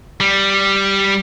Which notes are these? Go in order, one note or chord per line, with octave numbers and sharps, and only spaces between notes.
G3